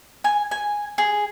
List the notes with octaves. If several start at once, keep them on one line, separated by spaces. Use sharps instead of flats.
G#5
G#5
G#4